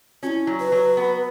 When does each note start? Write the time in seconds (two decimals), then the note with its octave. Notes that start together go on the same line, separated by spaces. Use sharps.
0.23 C#4 F#4
0.27 E4
0.47 F#3
0.60 B4
0.72 F#3
0.97 B3